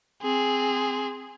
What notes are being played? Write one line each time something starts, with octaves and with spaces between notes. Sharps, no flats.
C4 G#4